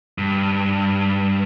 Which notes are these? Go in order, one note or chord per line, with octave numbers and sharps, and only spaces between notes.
G2